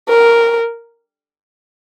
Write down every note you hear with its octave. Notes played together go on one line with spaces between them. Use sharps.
A#4